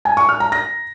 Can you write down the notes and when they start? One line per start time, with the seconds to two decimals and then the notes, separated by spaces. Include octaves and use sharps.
0.05 G#5
0.17 C#6
0.29 F6
0.40 A#5
0.52 A#6